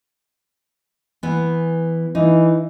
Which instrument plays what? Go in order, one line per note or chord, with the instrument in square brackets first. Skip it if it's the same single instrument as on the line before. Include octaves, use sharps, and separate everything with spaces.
[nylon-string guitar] E3 B3
[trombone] E3 [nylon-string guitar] D#4